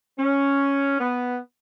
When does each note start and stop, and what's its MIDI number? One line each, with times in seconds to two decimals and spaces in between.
0.18 0.95 61
0.99 1.36 59